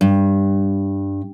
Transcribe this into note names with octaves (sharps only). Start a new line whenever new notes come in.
G2